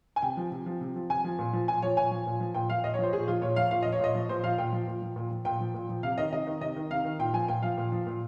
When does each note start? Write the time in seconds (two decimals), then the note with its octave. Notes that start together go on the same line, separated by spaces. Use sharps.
0.16 G#5
0.22 C3 G5
0.37 F3
0.52 C3
0.66 F3
0.81 C3
0.96 F3
1.10 C3 G#5
1.24 F3
1.39 A#2
1.53 F3
1.68 A#2 G#5
1.82 F3 C#5
1.97 A#2 G#5
2.11 F3
2.27 A#2
2.40 F3
2.55 A#2 G5
2.70 F3 F5
2.84 A#2 D#5
2.94 C#5
2.99 F3 C5
3.13 A#2 G#4
3.28 F3 F4
3.42 A#2 C#5
3.56 F3 F5
3.71 A#2 F5
3.83 F3 D#5
3.92 C#5
4.00 A#2 D#5
4.15 F3
4.29 A#2 C5
4.44 F3 F5
4.58 A#2 G5
4.72 F3
4.87 A#2
5.02 F3
5.16 A#2
5.31 F3
5.45 A#2 G5
5.60 F3
5.74 A#2
5.89 F3
6.03 C3 F5
6.18 D#3 D#5
6.32 C3 D#5
6.47 D#3
6.61 C3 D#5
6.76 D#3
6.91 C3 F5
7.04 D#3
7.19 A#2 G5
7.34 F3 G#5
7.48 A#2 G5
7.62 F3 F5
7.78 A#2
7.92 F3
8.07 A#2